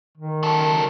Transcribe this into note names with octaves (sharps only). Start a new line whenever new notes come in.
D#3
F#3 A4